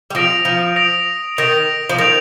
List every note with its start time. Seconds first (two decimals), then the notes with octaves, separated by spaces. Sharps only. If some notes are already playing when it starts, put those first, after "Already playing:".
0.10 G3
0.15 F3 D#6 A#6 D7 F7
0.45 F3
0.76 D#6 A#6 D7 F7
1.37 D#3 D#6 A#6 D7 F7
1.89 F3
1.98 D#3 D#6 A#6 D7 F7